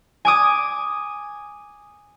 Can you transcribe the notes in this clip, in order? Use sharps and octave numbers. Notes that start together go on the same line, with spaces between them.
G#5 D6 D#6